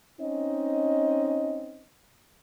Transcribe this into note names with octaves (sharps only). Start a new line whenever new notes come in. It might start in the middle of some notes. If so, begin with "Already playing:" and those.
C4 C#4 D#4 D#5